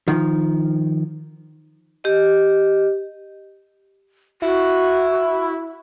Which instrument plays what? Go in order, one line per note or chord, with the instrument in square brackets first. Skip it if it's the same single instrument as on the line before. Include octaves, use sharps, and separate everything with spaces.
[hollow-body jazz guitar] D#3 F3
[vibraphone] G4 D#5
[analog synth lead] E4 [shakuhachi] F#4